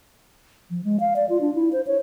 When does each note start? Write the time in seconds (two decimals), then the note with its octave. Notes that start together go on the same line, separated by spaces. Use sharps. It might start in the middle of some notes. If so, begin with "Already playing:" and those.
0.70 F3
0.84 G#3
1.00 F5
1.16 D5
1.29 F4
1.41 D4
1.55 E4
1.73 C5
1.87 C#5